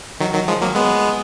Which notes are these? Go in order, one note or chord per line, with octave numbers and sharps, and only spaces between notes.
D#3 F#3
D#3 F#3
F3 G#3
F#3 A#3
G#3 B3